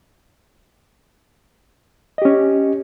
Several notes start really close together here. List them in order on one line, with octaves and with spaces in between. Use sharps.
D#5 G4 C#4